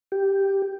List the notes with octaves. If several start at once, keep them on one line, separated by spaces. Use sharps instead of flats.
G4